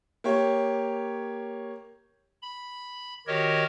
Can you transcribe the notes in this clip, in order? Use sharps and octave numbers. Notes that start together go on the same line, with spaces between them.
A#3 G4 C#5
B5
D#3 F#4 G4 A#4 C#5 D#5